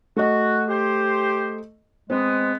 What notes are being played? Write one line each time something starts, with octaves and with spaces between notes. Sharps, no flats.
A3 F#4 D#5
G4 C5
G#3 B3 C4